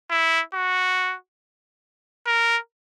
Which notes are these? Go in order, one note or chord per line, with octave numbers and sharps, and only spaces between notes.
E4
F#4
A#4